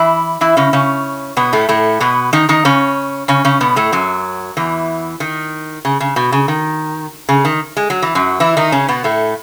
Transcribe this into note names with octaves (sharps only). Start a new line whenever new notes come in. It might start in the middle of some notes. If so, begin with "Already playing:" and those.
Already playing: E3 E4
E3 E4
C#3 C#4
C#3 C#4
B2 B3
A2 A3
A2 A3
B2 B3
D#3 D#4
D#3 D#4
C#3 C#4
C#3 C#4
C#3 C#4
B2 B3
A2 A3
F#2 F#3
E2 E3
D#3
C#3
C#3
B2
C#3
D#3
C#3
D#3
G#3
F#3
E3
F#2 F#3
E3 E4
D#3 D#4
C#3 C#4
B2 B3
A2 A3